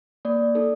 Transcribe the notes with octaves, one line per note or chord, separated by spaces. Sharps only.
A#3 D5
D#4 A4